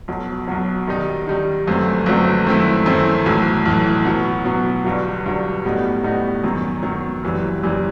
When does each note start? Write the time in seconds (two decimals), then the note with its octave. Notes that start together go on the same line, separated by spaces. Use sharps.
0.08 B1 B2 F#3
0.48 B1 B2 F#3
0.87 D#3 G3 D#4
1.27 D#3 G3 D#4
1.67 G1 F#2 F#3 A3 C4
2.06 G1 F#2 F#3 A3 C4
2.47 F#2 D#3 A3 C4 E4
2.86 F#2 D#3 A3 C4 E4
3.26 B1 A2 E3
3.66 B1 A2 E3
4.05 B2 F#3 B3
4.45 B2 F#3 B3
4.85 G1 G2 F#3
5.25 G1 G2 F#3
5.65 A2 G3 B3 D#4 F#4
6.03 A2 G3 B3 D#4 F#4
6.44 F#2 D#3 F#3 B3
6.83 F#2 D#3 F#3 B3
7.23 F#1 F#2 E3 G3
7.63 F#1 F#2 E3 G3